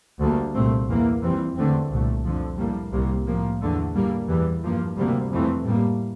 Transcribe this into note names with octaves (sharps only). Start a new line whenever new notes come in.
D2 D3 G3 A#3
C2 A#2 A3 C4
E2 E3 A#3
F2 E3 G3 C4
E2 D3 A3 C4
C2 A#2 A3
F2 D3 F3
A2 G3 A#3
C2 C3 G3 A#3
A2 F3 A#3
E2 D3 A3
A2 G3 A#3
E2 E3 G3
G2 F3 A#3
D2 C3 G3 A#3
F2 E3 A3 C4
A2 G3 A#3